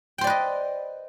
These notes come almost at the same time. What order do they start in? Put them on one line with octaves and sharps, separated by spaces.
G5 C5 D5 B4 D#5